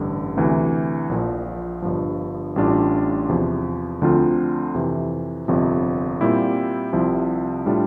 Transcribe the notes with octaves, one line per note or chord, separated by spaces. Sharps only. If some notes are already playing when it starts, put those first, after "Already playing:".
Already playing: A1 G2 D3
D2 C3 E3
A#1 A#2 F3
G1 G2 F3
A1 A2 G3 D4 F4
E2 C3 F3
D2 D3 F3 C4 F4
F2 C3 E3
G1 F2 C3 F3
A#2 G3 C4 E4
C2 C3 F3 C4 E4
A2 G3 D4 F4